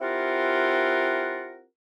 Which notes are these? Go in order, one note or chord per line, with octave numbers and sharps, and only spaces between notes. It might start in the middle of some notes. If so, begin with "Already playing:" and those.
C4 E4 F4 G4 A#4 F#5